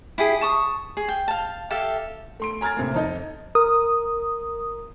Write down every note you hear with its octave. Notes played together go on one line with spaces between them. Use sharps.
E4 G4 G#4
A5 C#6 D#6
G#4
G5
F5 A5
G4 A4 E5 F5
A3 C6 D7
G#5 A#5 F6 G#6 A6
A2 C3 A#3
F2 D#4 D#5
A#4 D#6